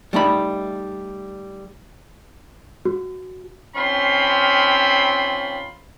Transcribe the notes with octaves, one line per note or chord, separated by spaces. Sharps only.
G3 A3 D#4 B5
F#4
D#3 C4 C#4 F4 B5 C6